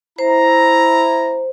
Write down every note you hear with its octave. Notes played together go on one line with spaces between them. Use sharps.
E4 C5 A#5